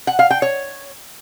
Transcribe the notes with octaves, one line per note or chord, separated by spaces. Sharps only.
F#5
F5
G5
C#5